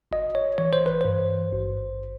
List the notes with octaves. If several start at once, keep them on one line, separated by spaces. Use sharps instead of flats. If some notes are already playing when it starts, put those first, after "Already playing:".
G1 D#5
C#5
E3 C#5
C5
B4
G2 C5
G#1